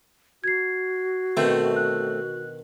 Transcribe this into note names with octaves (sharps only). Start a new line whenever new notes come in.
F#4 G#6 C7
B2 D3 D#3 A3 C4
F#6